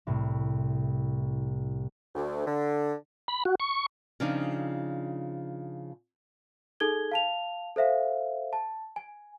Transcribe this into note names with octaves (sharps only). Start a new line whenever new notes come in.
C2 A2
D2
D3
B5
F#4
C#6
C#3 F3 C4 D4 D#4
D#4 G#4 A4 G#6 G7
F5 A5 F7
A4 C5 E5 F5
A5
G#5